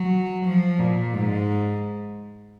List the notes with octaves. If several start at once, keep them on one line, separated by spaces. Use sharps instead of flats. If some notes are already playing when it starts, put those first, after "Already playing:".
Already playing: F#3
F3
A#2
G#2